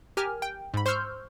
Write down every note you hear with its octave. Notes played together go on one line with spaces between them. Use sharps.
G4 A#4 G#5 F6
G5
G#2 B5
C5 C6 C#6 E6 F6 G6